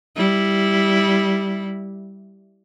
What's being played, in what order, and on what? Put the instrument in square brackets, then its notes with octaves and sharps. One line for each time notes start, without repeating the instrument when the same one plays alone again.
[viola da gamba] G3 E4